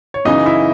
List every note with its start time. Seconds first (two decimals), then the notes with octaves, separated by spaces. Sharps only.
0.14 C#5
0.25 F#2 C#3 E3 D#4 D#5
0.46 E4 E5